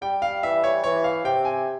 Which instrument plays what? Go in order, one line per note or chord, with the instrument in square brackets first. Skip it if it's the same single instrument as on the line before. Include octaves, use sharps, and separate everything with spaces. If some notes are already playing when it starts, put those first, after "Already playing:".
[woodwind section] G3 [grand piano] G5
[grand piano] F5
[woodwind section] E3 [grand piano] E5
[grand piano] C#5
[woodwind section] E3 [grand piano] C#5
[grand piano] F5
[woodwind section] C3 [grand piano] G5
[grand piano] G#5